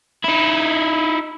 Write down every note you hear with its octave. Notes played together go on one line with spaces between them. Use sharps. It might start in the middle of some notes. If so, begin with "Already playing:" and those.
D#4 E4